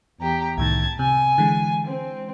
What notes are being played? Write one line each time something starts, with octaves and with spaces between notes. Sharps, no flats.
E2 G4 A#5
C2 A2 D#3 A5 G#6
C3 G#5
D3 E3 G#3
C4